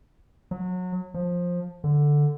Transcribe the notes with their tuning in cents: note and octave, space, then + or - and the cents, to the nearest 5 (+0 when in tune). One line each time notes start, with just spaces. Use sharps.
F#3 -25
F3 +15
D3 +0